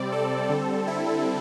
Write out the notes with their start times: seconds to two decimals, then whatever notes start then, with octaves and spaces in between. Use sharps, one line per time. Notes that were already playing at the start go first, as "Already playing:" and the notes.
Already playing: C3 G3 C4 D5
0.12 A4
0.49 D3 G3 C4
0.87 E4